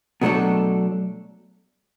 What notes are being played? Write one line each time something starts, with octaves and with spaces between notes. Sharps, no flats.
B2 F#3 A3 D4 A4